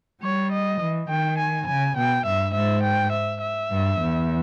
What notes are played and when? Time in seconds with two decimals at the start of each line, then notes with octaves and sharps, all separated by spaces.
0.22 G3 C#5
0.52 D#5
0.81 E3
1.09 D#3 G5
1.38 G#5
1.67 C#3 G#5
1.97 B2 G5
2.26 G2 E5
2.54 G#2 E5
2.83 G5
3.12 E5
3.42 E5
3.71 G2
4.00 E2